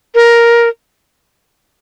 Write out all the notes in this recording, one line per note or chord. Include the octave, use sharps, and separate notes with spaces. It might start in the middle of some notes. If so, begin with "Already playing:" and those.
A#4